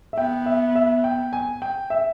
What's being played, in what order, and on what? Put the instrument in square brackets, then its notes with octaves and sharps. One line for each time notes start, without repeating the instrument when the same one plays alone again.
[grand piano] E5
[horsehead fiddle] B3 [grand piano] G5
[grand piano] E5
E5
G5
G#5
G5
E5